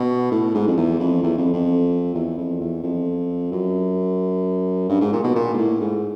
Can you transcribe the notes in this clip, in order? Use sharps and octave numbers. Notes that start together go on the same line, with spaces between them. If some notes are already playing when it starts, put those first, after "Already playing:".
Already playing: B2
A2
G#2
F2
E2
F2
E2
F2
F2
E2
F2
E2
F2
F#2
G2
G#2
A#2
B2
A#2
G#2
A2
G#2